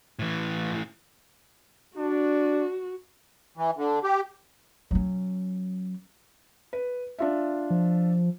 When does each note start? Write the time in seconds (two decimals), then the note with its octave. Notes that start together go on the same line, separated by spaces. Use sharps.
0.19 A2 E3
1.97 D4 F#4
3.57 E3
3.77 D3
4.03 G4
4.91 F#3 C#4
6.73 B4
7.19 D4 F4 E5
7.70 F3